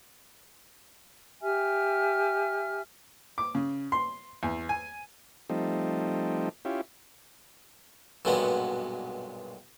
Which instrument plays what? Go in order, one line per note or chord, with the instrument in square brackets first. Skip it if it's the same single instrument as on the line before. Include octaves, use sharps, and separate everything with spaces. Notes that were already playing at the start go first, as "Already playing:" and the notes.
[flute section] G4 E5 G#5 F6
[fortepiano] D6
C#3
C6
E2
G#5
[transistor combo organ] F3 G3 A3 C4 D#4
C#4 E4 F4 G4
[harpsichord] B1 G2 A#2 F#3 G#3 B3